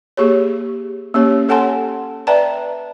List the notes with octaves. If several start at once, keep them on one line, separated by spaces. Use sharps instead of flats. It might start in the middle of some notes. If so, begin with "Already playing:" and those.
A#3 G4 G#4 C#5
A#3 C#4 G4 C#5
A4 C#5 F#5 G#5 A5 C6
B4 D5 E5 G5 A5 A#5